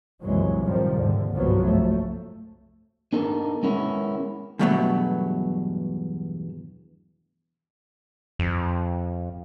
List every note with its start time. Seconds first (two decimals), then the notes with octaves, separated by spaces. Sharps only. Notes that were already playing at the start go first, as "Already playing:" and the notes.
0.23 C2 F#2 A#2 E3 F#3 G#3
0.64 F#2 A2 C3 D#3 F3 G3
0.96 D#2 G#2 D3
1.32 G1 C2 G#2 F3 F#3 B3
1.64 F#1 A3
3.13 B3 D4 D#4 A4 A#4
3.63 G#3 B3 C#4 E4 A#4
4.59 E2 G2 B2 F#3 A3 B3
8.39 F2